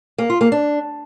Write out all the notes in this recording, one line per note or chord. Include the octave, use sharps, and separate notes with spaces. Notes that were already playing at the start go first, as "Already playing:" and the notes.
A#3
F4
A#3
D4